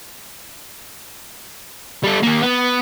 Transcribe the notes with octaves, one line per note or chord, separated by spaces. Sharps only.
G3 A4
D#2 A#3
B3